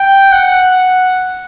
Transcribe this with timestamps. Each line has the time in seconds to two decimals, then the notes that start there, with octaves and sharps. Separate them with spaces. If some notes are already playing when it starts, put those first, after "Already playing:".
Already playing: G5
0.32 F#5